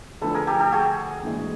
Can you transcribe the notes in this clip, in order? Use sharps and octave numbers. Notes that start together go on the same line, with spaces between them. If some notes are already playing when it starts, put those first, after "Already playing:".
D2 D3 F3 A4 B4
G#4 A#4
G4 A4
G4 A4
F#4 G#4
A#1 A2 E3 G#3